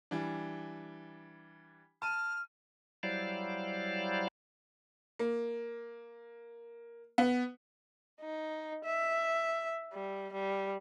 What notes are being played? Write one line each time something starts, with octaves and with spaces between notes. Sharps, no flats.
E3 G3 D4
A5 F6 D#7
F#3 G3 E4 C5 D5 F5
A#3
B3
D#4
E5
G3
G3